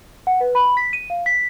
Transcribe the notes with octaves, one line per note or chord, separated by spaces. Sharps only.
F#5
B4
B5
B6
D#7
F5
B6